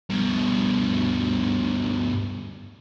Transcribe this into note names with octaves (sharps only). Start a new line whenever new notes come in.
G2 B2